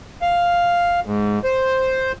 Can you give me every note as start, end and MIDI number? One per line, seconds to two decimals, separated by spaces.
0.22 1.00 77
1.05 1.39 44
1.44 2.12 72